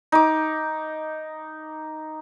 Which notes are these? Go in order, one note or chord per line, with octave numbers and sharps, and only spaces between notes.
D#4 D6